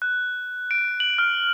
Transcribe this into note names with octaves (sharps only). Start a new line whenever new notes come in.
F#6
D7
F#7
F6